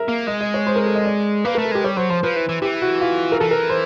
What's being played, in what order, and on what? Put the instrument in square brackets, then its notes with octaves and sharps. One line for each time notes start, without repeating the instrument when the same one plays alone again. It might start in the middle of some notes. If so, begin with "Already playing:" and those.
Already playing: [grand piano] A#4 E5
[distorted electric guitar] A#3
[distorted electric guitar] G#3 [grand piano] D#5
[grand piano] D#5
C#5
C5
A#4
A4
D#5
D5
[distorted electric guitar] A#3 [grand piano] B4
[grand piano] A#4
[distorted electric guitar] A3
[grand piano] A4
[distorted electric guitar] G#3 [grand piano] G4
[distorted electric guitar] G3 [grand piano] C#5
[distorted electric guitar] F#3 [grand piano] C5
[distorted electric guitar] F3 [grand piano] C5
[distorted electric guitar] F3 [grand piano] B4
[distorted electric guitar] E3
E3
[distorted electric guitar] E3 [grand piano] G4
[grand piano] F#4
F4
A#4
[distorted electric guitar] E3 [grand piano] A4
[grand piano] A#4
C5